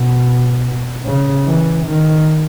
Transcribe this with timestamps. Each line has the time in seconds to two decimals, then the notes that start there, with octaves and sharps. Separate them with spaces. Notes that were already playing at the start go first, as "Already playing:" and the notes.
Already playing: B2
1.06 C#3
1.46 E3
1.86 D#3